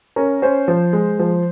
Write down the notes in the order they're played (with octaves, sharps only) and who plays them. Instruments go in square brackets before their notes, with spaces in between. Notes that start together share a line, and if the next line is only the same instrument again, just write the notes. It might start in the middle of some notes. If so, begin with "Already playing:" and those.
[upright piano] C#4 A#4
C#4 C5
F3
G#3
F3